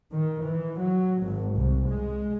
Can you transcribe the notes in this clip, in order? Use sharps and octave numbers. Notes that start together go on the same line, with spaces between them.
D#3
E3
F#3
G#1
C2
G#3